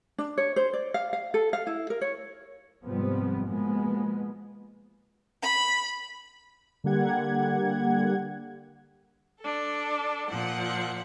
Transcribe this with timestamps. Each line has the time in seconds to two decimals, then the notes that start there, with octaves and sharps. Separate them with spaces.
0.18 D4
0.38 C#5
0.56 C5
0.73 D5
0.94 F5
1.13 F5
1.34 A4
1.53 F5
1.67 E4
1.90 A#4
2.01 C#5
2.85 G#2 C3 F3 G3 B3 C4
3.47 B2 F3 G#3 A#3 B3
5.42 B5
6.84 D3 G3 A#3 G4 F#5 G#6
9.40 D4 A4
10.28 A#2 F3 F#5